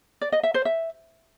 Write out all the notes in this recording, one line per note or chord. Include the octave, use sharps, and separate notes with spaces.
D5
D#5
E5
C5
E5